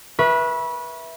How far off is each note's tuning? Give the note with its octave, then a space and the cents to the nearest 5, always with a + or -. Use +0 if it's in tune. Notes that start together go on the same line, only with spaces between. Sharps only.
B4 -25 E5 +0 C#6 +0